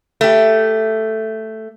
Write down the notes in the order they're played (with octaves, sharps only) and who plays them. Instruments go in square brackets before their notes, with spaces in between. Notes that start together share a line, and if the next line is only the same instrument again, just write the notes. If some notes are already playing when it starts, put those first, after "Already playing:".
[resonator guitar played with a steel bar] A3 G4